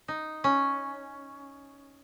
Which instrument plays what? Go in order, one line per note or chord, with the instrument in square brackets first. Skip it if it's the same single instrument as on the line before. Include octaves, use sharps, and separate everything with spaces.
[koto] D#4
C#4